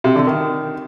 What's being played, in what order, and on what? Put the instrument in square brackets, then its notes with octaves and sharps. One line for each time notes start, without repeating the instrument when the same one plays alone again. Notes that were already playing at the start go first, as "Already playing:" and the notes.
[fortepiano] C3
D3
D#3